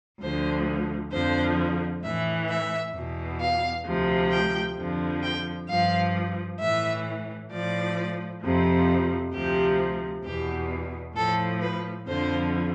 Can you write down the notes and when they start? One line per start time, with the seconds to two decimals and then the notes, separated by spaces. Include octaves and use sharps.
0.21 D2 D3 F3 C5
1.12 F2 D3 F3 C5
2.03 A2 E3 E5
2.49 E5
2.95 E2 B2
3.41 F5
3.86 D2 C3 F3
4.31 G5
4.77 F2 D3 F3
5.23 G5
5.68 G2 F3 F5
6.60 A2 E3 E5
7.51 A2 F3 D5
8.43 F2 C3 F3
9.33 D2 C3 F3 G4
10.24 E2 B2 G4
11.16 A2 F3 A4
11.62 B4
12.07 F2 D3 F3 C5